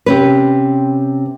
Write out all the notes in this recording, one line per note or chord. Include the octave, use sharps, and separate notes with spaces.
C3 C#4 B4